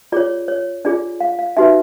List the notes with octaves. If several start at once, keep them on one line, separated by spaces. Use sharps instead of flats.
F4 G#4 C#5 D5
C#5
D4 F4 G#4 D5
F5
F5
D#4 F#4 B4 E5